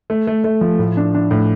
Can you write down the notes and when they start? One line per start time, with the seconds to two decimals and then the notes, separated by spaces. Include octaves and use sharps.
0.10 A3
0.27 A3
0.44 A3
0.61 F3
0.79 A2
0.97 D4
1.14 D4
1.31 A2